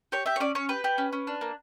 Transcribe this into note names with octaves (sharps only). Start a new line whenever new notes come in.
G4 C#5
G4 E5
C#5
C#4 D5
C#4 C#5
G4 B4
G4
C#4
C#4
D4
A#3